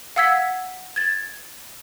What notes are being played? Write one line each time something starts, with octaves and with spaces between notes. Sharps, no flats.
F5 F#5 E6 G#6 B6
G#6 A6